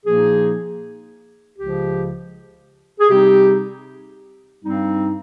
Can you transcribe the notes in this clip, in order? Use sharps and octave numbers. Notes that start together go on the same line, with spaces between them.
A#2 F3 A#3 D#4 G#4
C#2 C#3 F3 G4
G#4
C3 G3 C4 D#4 G4
G2 G3 C4 D#4